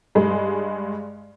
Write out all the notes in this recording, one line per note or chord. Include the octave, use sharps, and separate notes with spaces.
G2 G#3